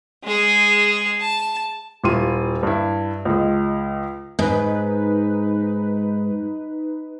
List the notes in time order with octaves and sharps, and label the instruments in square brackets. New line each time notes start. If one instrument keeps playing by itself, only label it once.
[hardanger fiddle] G#3 G#4
A5
[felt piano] D#1 E4 F4 C6 D#7
G2 E4
C#2 G#3
[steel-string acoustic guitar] G#2 [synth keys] D#4 B4